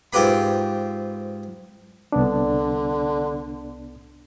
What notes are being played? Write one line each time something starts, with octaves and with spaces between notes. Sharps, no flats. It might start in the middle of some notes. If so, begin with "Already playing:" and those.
G#2 C4 F4 G4 B4 B5
C2 D3 B3 D4